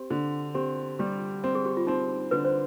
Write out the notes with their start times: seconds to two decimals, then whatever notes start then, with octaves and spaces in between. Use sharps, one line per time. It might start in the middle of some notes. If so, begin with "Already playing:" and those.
Already playing: C4 G4
0.10 D3
0.54 C4 G4
0.99 G3 G4
1.44 C4
1.55 G#4
1.66 G4
1.77 F4
1.87 C4 D#4
2.31 D3 B4
2.45 C5